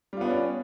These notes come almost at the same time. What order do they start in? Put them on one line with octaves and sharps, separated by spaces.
G3 F4 B3 D4 C#4